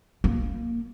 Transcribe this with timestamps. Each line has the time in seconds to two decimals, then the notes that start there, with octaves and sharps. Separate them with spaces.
0.24 A#3